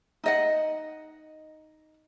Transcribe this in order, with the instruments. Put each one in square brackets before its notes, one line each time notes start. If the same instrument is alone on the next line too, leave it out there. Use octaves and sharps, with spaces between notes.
[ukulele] D#4 D#5 F#5